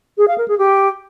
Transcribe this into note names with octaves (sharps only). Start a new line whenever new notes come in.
G#4
F5
A#4
G#4
G4